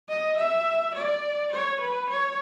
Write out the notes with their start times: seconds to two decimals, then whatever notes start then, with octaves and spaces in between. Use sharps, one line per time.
0.09 D#5
0.37 E5
0.95 D5
1.52 C#5
1.80 B4
2.10 C#5